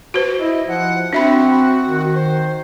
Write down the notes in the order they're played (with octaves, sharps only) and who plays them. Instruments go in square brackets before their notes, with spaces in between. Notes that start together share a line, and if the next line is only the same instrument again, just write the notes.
[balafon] F#4 B4 C5
[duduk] E4 [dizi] D#5
[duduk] F3 [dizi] F#5
[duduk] C4 [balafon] D4 E5 B5 [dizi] F#4
[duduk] D#3
[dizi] C5